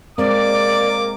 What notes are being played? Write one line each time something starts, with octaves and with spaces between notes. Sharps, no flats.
G#3 A#3 C4 D5 D6